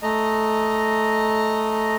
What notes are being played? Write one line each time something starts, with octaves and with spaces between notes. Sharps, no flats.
A3 D#5 A#5